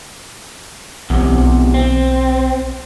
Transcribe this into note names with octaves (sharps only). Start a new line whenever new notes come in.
B1 E2 C3
C4